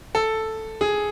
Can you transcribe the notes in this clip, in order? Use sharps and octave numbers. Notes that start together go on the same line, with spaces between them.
A4
G#4